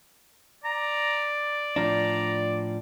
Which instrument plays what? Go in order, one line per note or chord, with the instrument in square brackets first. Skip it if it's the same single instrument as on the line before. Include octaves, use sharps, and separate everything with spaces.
[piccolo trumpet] D5 [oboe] A#5
[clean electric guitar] A2 F3 D4 [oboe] A#5